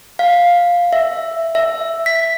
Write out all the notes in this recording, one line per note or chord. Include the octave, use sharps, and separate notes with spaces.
F5
E5
E5
B6